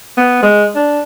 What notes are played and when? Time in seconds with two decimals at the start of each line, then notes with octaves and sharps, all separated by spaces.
0.17 B3
0.43 G#3
0.75 D4